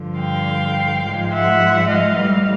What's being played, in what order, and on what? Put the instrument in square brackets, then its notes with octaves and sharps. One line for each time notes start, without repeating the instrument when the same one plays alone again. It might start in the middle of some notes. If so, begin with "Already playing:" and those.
Already playing: [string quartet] G2 D3 F3
F5 G5
G#2 F3 G#3
E5 F#5
D#5 F5
A2 E3 G3